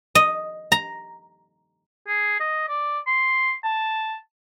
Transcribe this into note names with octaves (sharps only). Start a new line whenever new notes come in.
D#5
A#5
G#4
D#5
D5
C6
A5